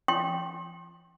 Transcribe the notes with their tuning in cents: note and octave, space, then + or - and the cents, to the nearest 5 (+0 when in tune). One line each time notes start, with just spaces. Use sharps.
G5 +0 C6 +30